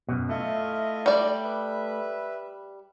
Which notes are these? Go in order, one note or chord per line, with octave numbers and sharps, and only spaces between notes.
F#2 B2
A3 E4 F4 D#5
G3 D5
B4 E5